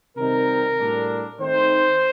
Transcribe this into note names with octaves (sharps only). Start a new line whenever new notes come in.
C3 D#3 G3 C4 D#4 A#4
A2 G3 D4
D#3 A3 C4 D#4 C5